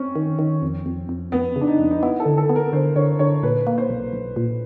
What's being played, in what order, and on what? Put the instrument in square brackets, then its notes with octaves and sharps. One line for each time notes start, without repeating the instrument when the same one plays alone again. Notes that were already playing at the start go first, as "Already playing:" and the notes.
Already playing: [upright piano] C4 C#4
[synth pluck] D#3
D#3
F2
F2
F2
[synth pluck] F2 [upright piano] B3
[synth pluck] C#3
[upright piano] D4
D#4
[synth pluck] F2
[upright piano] D#4
[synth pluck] B3 [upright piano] E4
[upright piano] A4
[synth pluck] D3
[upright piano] A4
[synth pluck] B3
[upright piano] A#4
[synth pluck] D3 [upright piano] C5
[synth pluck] D3 [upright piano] C#5
[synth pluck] D3 [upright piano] C#5
[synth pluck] A#2 [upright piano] B4
[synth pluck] A#3
[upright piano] C5
[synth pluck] B1
B1
A#2